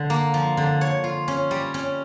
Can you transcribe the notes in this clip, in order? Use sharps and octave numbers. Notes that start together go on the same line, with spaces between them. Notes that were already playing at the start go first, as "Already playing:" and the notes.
Already playing: D3
A#3
F3
D3
C#5
F4
C#4
G3
C#4